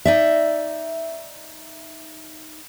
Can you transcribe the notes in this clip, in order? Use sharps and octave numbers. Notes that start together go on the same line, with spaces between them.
D#4 D5 E5